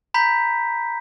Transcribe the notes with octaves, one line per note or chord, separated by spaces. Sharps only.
A#5 B5 G6 B6